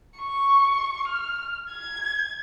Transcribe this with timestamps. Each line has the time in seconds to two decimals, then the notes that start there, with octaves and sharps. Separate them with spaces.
0.19 C#6
1.08 F6
1.71 G#6